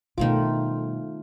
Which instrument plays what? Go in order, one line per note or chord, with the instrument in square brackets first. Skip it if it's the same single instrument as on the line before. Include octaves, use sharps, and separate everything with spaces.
[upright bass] B2 G3 [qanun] D#3 F3 D6 [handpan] A3 F4